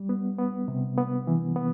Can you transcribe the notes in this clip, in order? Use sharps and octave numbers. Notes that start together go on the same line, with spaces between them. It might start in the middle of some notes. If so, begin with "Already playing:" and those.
Already playing: G3
B3
B3
C3
B3
E3
B3